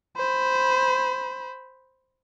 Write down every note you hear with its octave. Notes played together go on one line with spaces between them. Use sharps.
C5 B5